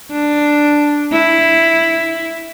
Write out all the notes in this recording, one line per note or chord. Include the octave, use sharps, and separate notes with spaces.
D4
E4